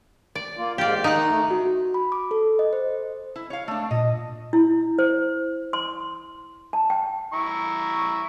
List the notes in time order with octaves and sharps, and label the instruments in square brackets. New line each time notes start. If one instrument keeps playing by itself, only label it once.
[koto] D5
[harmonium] A#3 F4
[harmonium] G#2 A#3 F5 [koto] G4 D5
[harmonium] D#3 [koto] D#4 F#5
[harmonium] A3
[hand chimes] F#4
B5
D6
A4
D#5
C5
[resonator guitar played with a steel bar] E4
C#5 F5
A3 D4
[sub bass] A#2 [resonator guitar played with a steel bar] D#5
[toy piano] E4
C5
C6
A5
G5
[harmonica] E4 A#5 C#6